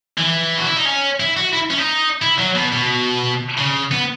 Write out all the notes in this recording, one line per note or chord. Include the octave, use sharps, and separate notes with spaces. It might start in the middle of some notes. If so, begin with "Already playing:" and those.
E3
F#4
E4
D#4
C#4
E4
F#4
E4
C#4
D#4
E4
F#3
B2
B2
C#3
B3